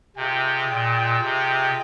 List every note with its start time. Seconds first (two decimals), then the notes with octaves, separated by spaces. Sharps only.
0.16 C3 F4 G#4 D#5 G5
0.69 A#2
1.22 C3